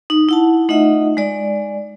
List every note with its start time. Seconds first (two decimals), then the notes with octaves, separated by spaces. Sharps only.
0.10 D#4
0.29 E4 F#5 A5
0.69 A3 D#4 F4 D#5 E5 F#5
1.17 G#3 D5